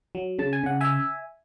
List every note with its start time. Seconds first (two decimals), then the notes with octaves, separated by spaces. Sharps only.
0.15 F#3
0.39 C#3 A5
0.53 G#5
0.64 C#3 F#5
0.81 E5 G#5